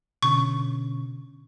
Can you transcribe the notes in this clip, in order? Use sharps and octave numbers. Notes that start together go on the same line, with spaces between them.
B2 D3 C#4 C#6